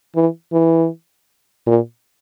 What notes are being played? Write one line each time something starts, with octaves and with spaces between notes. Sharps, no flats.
E3
E3
A#2